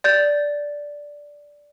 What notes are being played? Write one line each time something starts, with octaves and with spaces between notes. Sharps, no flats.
D5 G6 A6